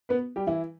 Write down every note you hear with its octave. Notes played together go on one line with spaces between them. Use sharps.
B3 B4
G3 G4
E3 E4